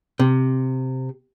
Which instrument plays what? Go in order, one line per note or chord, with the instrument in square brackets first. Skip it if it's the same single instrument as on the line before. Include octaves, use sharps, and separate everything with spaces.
[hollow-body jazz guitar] C3